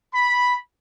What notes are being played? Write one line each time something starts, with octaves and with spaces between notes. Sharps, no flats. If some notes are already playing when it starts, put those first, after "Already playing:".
B5